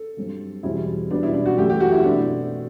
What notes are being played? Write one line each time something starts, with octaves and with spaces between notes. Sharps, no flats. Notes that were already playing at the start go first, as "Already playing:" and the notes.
Already playing: A4
G2 F#3 C4
E2 B2 G3 C4 E4
B2 G3 B3 D4
E4
D4
F#4
F#2 E3 A3 G4
G4
F#4
E4
B2 A3 C4 D4